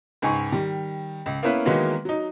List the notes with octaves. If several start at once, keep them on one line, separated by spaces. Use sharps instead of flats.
C#2 G#2 G#5 C#6
D#3 G3
C#2
A#3 B3 C#4 E4 B4
D#3 E3 F#3 G#3 A#3 B3
F#3 D#4